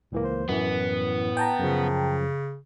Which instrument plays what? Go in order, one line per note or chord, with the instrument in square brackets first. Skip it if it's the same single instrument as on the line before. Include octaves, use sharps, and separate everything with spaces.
[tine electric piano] C#2 E3 A#3 [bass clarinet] A2
[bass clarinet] C5
[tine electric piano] F#2 E3 [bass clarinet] A2 [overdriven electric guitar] B3
[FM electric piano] G5 A5 A#5
[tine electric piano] F#2 F3 [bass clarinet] C#3